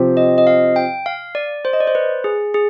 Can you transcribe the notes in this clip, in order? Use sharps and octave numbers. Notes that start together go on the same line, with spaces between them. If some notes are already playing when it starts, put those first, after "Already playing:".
Already playing: C3 F3 C4 G4 C5
D#5
D#5
F5
G5
F5
D5
C5
D#5
D5
C5
B4
G#4
G#4